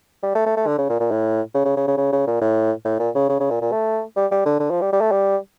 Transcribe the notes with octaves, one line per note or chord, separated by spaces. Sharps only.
G3
A3
A3
A3
D3
C#3
A#2
A#2
A2
C#3
C#3
C#3
C#3
C#3
C#3
A#2
A2
A2
A#2
C#3
C#3
C#3
A#2
A#2
A3
G3
G3
D3
D3
F3
G3
G3
A3
G3